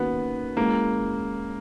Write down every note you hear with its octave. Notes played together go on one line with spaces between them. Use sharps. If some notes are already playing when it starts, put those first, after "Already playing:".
Already playing: D#3 A#3 B3 C#4 F#4
G#3 A#3 C#4 E4